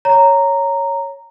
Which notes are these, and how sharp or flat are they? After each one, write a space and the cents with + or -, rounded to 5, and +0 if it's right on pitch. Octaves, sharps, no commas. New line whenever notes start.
C#5 +0 A#5 -10